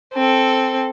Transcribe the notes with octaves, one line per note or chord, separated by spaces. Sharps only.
C4 A4